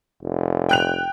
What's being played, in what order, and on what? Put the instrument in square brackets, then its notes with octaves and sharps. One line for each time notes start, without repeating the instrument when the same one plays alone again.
[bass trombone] F1
[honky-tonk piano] G5 F#6 F7